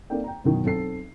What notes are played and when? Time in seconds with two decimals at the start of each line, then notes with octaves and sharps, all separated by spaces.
0.10 A#3 C4 D#4 A4 D5 G5
0.24 G5 A#5
0.44 F#2 B2 D#3
0.64 B1 C4 A4 C7